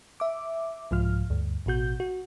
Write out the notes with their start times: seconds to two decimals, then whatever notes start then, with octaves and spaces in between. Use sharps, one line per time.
0.20 E5 D6
0.91 C2 G#2 F3 F4 F6
1.30 D2 G2
1.66 A1 B2 F#4 G6
2.00 F#4